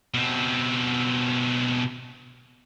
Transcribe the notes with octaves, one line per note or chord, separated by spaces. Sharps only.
B2 C4